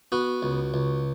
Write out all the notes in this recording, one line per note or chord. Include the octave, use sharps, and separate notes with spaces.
B3 F#4
C#2
C#2